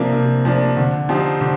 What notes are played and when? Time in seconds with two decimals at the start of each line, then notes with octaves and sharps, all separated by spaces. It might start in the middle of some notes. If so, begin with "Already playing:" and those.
Already playing: C3 F3 A#3 D4
0.12 C3
0.45 F3 A#3 D4
0.77 D3
1.09 F3 C4 D#4 G4
1.41 D3